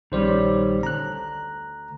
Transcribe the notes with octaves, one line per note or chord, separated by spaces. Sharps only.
A#1 D#3 G3 C#4 C5 D5
D2 A#5 F#6